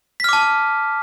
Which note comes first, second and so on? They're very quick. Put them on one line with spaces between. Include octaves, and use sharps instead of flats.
B6 F6 D6 A5